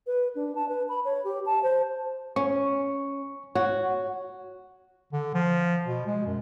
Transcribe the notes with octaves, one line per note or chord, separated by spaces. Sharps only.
B4
D4
A5
B4
B5
C#5
G4
A5
C5
C#4 C#6
F#4 C#5
D3
F3
B2
G#3
F#2